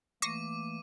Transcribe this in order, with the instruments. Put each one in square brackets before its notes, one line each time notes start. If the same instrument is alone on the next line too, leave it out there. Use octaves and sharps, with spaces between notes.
[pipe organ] E3 A3 A#3 [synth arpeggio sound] C#6 A#6 C7 [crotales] D6 D#7